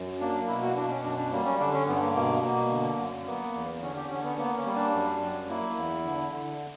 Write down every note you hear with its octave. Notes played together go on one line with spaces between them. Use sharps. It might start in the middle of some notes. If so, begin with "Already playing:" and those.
Already playing: F#2
A#3 D4
B2 E4
F#4
B2 D4
C#4
F#2 D4
D4
G3 A#3
C#4
D3 D4
C#4
G2 B3
A#3
B2 A#3
B2 A#3
D3
F#2
A#3 B3
E2
D3 C#4
G4
D3 C#4
B3
A#3 B3
C#4
G3
D4
F#2
F#2
A#3 E4
E2
D3
D3